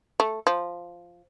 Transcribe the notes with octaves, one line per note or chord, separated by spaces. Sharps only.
A3
F3